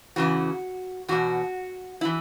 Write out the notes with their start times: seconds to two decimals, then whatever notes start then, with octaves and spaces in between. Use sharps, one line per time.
0.16 E2 C#3 E3 F#4
1.08 E2 B2 F#4
2.01 E3 E4